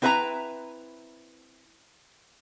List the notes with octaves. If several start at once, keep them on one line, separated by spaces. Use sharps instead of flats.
C4 E4 B4 E5 F5 A#5